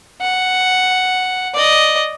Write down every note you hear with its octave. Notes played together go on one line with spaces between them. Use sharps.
F#5
D5 D#5